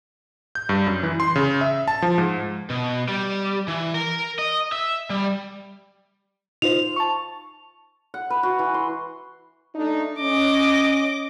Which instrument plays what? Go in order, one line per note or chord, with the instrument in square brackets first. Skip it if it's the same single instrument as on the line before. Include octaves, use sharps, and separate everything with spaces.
[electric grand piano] G6
G2
F#2
E3
C6
C#3
E5
A5
F3
G#2
[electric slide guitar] B2
G3
E3
A#4
D#5
E5
G3
[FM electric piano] D#4 F4 C5 [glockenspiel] F7
[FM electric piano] A5 C#6
[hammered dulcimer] F#5
B4
F#4
E3
C6
[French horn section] A3 D4 D#4
[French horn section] C#4 [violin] D#5 D6